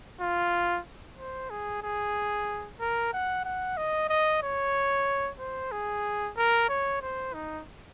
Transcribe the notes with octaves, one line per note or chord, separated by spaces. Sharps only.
F4
C5
G#4
G#4
A#4
F#5
F#5
D#5
D#5
C#5
C5
G#4
A#4
C#5
C5
D#4